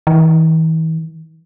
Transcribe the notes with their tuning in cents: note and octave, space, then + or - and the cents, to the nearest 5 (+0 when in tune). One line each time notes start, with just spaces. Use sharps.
E3 -45